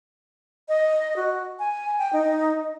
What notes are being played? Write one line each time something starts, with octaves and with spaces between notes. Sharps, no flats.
D#5
F#4
G#5
G5
D#4